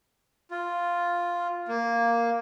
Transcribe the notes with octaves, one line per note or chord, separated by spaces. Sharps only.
F4
A#3